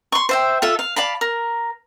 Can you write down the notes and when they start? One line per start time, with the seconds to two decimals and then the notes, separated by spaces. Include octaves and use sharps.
0.12 C6 C#6
0.29 C5 E5 G5
0.62 F4 A4 E5
0.79 F5
0.96 D5 F5 A5 B5
1.21 A#4